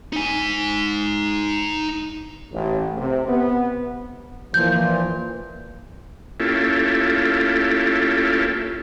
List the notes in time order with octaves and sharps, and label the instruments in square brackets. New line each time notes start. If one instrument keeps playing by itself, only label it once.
[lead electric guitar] D#4 G#5
[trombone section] A1
C3
B3
[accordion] A#2 [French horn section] E3 F3 [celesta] G6
[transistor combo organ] A#3 C#4 E4 F4 G4 A4